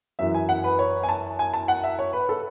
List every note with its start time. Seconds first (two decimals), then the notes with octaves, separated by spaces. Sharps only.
0.19 F#2 E3 E5
0.34 G#5
0.49 F#5
0.64 B4
0.79 C#5
1.03 G#5
1.09 A5
1.39 G#5
1.54 A5
1.68 F#5
1.84 E5
1.99 C#5
2.13 B4
2.29 A4